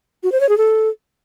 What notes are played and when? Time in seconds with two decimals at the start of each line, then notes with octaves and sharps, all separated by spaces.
0.23 F#4
0.32 C5
0.40 C#5
0.49 G#4
0.58 A4